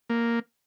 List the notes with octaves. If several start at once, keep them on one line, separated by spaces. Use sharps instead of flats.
A#3